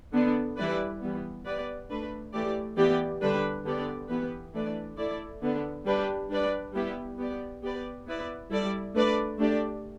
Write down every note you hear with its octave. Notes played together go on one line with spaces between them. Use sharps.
D3 B3 D4
E3 G3 E4 B4 D5
E3 G3 B3
B3 G4 B4 D5
A3 D4 B4
E3 A3 G4 D5
E3 B3 G4 D5
D3 G3 D4 B4
D3 B3 G4 D5
E3 B3 G4 B4
E3 A3 D4 B4 D5
A3 E4 A4 D5
D3 B3 D4
G3 D4 G4 B4
G3 D4 B4 D5
G3 B3 E4 G4
B3 G4 D5
B3 G4 B4 D5
B3 E4 B4 D5
G3 E4 A4 D5
A3 D4 B4 D5
A3 D4 G4 D5